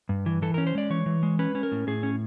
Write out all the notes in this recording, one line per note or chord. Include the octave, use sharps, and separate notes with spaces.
G2
E3
E3 A4
C#4 A#4
C5
G#3 D5
E3 C#5
E3
G#3
C#4 B4
C#4
A#4
A2
A2 G#4
C#4